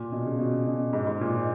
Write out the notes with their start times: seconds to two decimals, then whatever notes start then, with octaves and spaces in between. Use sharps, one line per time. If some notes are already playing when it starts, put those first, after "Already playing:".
Already playing: A#2
0.12 B2
0.26 C#3
0.39 B2
0.67 B2
0.93 G#2
1.07 G#2
1.21 A#2